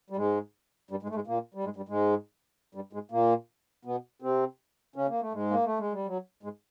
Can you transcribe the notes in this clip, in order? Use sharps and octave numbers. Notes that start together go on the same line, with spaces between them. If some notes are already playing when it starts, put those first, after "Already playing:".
G3
G#2 G#3
G2 G3
G#2 G#3
A3
G#2 G#3
A#2 A#3
G3
G#2 G#3
G2 G3
G#2 G#3
G2 G3
G#2 G#3
A#2 A#3
B2 B3
C3 C4
C#3 C#4
A#3
A3
G#2 G#3
A#3
A3
G#3
G3
F#3
G#2 G#3